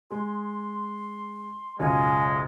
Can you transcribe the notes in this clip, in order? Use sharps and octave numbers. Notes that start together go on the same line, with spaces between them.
G#3 G#4 C6
F#1 B1 G#3 F4 C#5 D#5 G#5